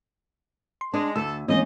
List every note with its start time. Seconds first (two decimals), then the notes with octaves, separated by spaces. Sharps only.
0.81 C6
0.94 G#3 D4
1.16 D2 A4 E6
1.48 D#2 E3 G#3 C4 C#4 D#5